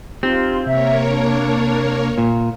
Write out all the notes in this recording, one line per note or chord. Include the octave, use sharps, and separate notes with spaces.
C4 D#4 F4 G4
C3 A#3 A#4 C#5 E5
D4
A#2